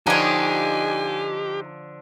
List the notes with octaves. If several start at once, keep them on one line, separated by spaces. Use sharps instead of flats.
D3 F3 D4 D#4 G4 C#5 G#5